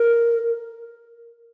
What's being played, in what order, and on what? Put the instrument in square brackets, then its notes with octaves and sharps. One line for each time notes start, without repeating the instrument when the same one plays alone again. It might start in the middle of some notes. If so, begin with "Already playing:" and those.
Already playing: [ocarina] A#4